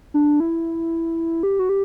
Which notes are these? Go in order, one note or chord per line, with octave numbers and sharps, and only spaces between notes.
D4
E4
G4
F#4
G4